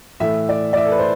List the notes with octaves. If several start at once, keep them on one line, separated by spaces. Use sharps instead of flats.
A2 E3 A3 E5
D5
D5
E5
A4
B4
C5